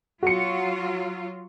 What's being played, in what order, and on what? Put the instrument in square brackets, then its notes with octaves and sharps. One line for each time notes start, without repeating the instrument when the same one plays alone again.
[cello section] F#3 F4 [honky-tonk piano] F#4 C#7